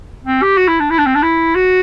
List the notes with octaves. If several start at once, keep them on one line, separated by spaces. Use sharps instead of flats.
C4
G4
F#4
E4
D4
E4
D4
C4
D4
E4
F#4